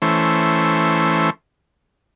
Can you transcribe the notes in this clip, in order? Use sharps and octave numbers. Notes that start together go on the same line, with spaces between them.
E3 A3 C#4 C5